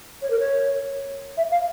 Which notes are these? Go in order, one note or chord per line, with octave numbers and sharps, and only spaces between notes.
C#5
A#4
C#5
E5
F5